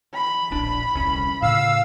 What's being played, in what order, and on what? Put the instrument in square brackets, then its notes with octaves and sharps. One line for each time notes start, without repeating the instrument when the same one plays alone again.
[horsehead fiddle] B5
[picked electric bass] D1 A#1 D4
D#1 C2 C#4
[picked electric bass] A2 C#3 [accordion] F5 E6